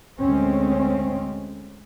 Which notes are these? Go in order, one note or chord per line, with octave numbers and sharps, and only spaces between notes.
D2 G#3 C4 C#4